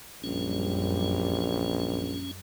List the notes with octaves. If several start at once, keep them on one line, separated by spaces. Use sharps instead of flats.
A#1 F#2 G3 C#4